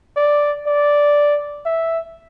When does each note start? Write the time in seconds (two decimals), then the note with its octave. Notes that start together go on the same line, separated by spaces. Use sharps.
0.17 D5
0.67 D5
1.66 E5